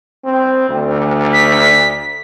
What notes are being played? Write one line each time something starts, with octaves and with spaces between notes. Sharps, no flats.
C4
D2
B6